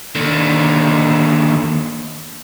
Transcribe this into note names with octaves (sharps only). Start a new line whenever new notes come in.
D#2 D3